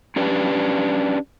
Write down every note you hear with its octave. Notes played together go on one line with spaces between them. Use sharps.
C#4 D4 G4 B4